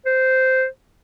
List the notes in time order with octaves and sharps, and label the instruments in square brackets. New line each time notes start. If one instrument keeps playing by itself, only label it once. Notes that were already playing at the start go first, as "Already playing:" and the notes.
[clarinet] C5